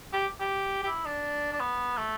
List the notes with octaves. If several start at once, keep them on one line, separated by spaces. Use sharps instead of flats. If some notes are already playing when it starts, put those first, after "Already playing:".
G4
G4
G4
E4
D4
D4
B3
A3